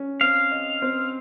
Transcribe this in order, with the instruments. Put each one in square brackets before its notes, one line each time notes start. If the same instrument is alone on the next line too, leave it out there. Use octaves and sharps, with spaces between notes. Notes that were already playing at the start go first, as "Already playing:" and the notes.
Already playing: [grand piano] C#4
[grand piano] C4 [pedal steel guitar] F5
[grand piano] D#5
C4